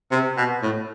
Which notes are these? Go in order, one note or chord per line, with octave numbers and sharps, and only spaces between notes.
C3
B2
A2